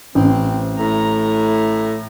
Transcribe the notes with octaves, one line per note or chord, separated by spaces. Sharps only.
A1 C4
A2 A#5